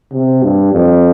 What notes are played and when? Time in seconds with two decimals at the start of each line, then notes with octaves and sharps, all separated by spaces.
0.12 C3
0.42 G2
0.73 F2